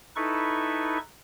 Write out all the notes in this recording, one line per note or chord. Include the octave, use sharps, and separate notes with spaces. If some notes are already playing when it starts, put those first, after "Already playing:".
D#4 E4 A4 B4 C#6